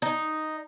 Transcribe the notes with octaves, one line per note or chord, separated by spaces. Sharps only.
D#4